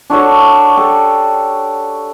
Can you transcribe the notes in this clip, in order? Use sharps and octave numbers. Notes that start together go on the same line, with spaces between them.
D4 F#4 A4 C#5
G4 A4